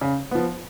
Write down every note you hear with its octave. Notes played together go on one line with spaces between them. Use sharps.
C#3
F3 B3